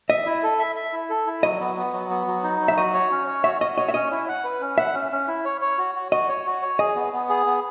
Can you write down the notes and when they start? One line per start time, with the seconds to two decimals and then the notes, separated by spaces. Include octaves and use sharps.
0.09 D#5 E5
0.26 E4
0.43 A4
0.59 E5
0.76 E5
0.92 E4
1.10 A4
1.27 E4
1.43 F#3 D#5
1.60 B3
1.77 B3
1.93 F#3
2.10 B3
2.27 F#3
2.43 D#4
2.61 F#3
2.68 E5
2.77 F#4 D#5
2.94 C#5
3.11 C#4
3.27 C#5
3.44 F#4 E5
3.61 F#4 D#5
3.77 C#5 D#5
3.89 E5
3.94 C#4 D#5
4.11 E4
4.28 F#5
4.44 B4
4.61 C#4
4.78 E5 F#5
4.94 C#4
5.12 C#4
5.28 E4
5.45 C#5
5.61 C#5
5.78 F#4
5.95 F#4
6.12 F#4 D#5
6.29 C#5
6.46 F#4
6.62 C#5
6.79 G#4 D#5
6.96 B3
7.13 B3
7.29 G#4
7.46 B3